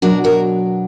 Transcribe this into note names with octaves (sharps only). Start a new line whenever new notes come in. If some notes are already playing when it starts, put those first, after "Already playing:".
B2 F#3 D4 F#4 A#4
F#4 A#4